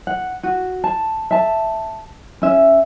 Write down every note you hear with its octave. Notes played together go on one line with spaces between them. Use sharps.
F#5
F#4
A5
E5 A5
C#4 E5